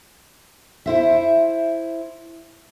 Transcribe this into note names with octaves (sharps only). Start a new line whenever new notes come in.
E4 C5 E5